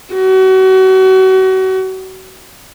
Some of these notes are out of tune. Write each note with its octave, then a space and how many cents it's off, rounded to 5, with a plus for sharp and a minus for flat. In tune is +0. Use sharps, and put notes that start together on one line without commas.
F#4 +35